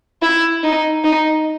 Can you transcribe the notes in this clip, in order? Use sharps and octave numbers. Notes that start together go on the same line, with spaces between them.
E4
D#4
D#4